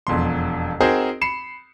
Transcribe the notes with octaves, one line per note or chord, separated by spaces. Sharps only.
E1 F2 B2 C6
C4 D#4 F#4 G#4 A#4 C5
B5 C7 C#7 E7